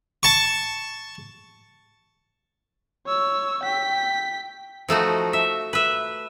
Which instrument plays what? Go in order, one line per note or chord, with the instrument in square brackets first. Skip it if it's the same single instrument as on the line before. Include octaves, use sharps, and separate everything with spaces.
[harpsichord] A5 C#6
[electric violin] C#5 E6
G5 B6
[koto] F3 A3 D#4 F#4
E5
B4 E5